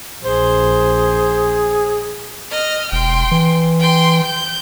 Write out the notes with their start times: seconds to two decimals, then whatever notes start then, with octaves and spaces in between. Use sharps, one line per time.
0.24 A#1 G#4 C5
2.51 D#5 F6
2.92 E1 G5 C6
3.31 E3
3.80 G5 C6
4.25 G6